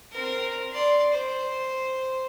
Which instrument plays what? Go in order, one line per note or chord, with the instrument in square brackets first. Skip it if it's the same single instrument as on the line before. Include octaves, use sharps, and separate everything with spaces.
[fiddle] C4 A#4
D5 C6
C5